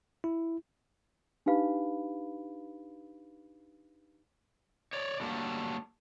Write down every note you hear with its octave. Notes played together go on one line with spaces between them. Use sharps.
E4
D4 D#4 G4 B4 F5 B5
C#5 D5
D3 F#3 G3 A3 A#3 D4